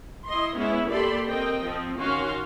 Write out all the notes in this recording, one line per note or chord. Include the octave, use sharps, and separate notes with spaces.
E4 D#5 C6
G#3 B3 C#4 E4
A#3 G4 A4 D5 B5 C6
C4 A#4 D#5 G5
F3 C4
D#3 C#4 F#4 F5 C6